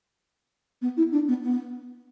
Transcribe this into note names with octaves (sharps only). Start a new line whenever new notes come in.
B3
E4
D4
B3
B3